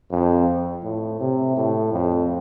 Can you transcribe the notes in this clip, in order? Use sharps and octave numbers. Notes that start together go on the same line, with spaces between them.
F2
A2
C3
A2
F2